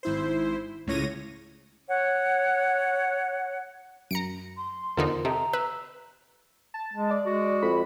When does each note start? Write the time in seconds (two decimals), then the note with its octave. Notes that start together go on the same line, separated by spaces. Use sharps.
0.03 G#1 E4 C5
0.87 C#2 A2 C#3 C#5 A#6 D#7
1.89 C#5 F#5
4.11 F#2 A#5 C#7 D7
4.57 C6
4.97 E2 D3 D#4 F4 A#4 C5
5.25 C3 A4 D#5 E5 A#5
5.53 B4 E6
6.74 A5
6.93 G#3
7.11 D5
7.26 G#3 F#4
7.62 F2 B5